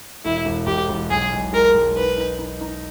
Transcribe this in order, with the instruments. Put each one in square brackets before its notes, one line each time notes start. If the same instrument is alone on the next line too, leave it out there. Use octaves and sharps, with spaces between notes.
[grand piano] E1 [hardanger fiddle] E4
[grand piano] E1
[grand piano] E1 [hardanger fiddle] G4
[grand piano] E1
[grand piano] B1 [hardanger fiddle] G#4
[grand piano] B1
[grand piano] G#3 [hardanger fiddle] A#4
[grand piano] B1
[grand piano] D#4 [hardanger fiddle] B4
[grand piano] D#4
D#4
D#4